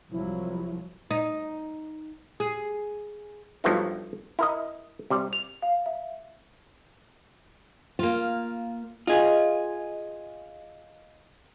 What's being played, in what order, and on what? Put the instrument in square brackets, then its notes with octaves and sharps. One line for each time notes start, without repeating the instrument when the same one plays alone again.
[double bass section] C2 F3 F#3 [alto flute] E4
[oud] D#4
G#4
[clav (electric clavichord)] G2 F3 F#3 A3 B3 D#4
E4 A#4 D#5
C3 G3
[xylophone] F7
F5
E5
[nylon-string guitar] A#3 F4
[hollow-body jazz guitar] F4 G#4 [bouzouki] D#5